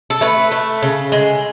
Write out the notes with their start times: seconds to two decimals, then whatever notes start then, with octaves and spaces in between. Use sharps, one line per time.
0.10 A4
0.21 A3 B4
0.52 A3
0.82 C#3
1.12 G#3